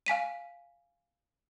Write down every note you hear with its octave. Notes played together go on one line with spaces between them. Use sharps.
F5 G#5 B6 D#7